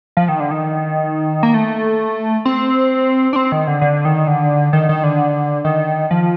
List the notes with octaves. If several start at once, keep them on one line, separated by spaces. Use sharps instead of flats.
F3
D#3
D3
D#3
A#3
A3
C4
D4
C4
D#3
D3
D3
D#3
D3
D#3
D#3
D3
D#3
F3